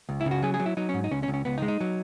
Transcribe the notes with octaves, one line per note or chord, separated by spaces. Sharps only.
C#2
E4
C#3
F#4
F#3 G#4
G#4
F#3
E4
F#3 D#4
G#2 C#4
D#4
C#2 C#4
C#4
C#2
C#4
C#2 B3
D#4
G#3
D#4
F#3